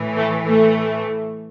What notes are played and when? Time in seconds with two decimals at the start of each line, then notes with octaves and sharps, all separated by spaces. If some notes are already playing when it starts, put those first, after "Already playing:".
Already playing: A2 E3
0.16 A3
0.47 A3